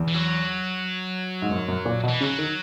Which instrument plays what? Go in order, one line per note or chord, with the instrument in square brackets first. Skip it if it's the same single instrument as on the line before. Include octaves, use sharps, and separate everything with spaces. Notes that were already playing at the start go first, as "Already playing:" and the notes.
Already playing: [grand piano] E2
[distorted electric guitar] E3
F#3
[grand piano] G#2
F#2
F#2
A#2
B2
[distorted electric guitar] E3
[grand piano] C#3 [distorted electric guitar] F#3
[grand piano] D#3